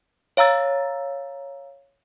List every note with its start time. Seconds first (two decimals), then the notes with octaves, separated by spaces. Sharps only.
0.37 C#5 F5 A#5 E6 A6